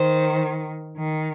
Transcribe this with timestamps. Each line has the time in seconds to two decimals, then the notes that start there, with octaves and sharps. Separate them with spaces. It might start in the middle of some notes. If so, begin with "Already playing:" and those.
Already playing: D#3 C5
0.98 D#3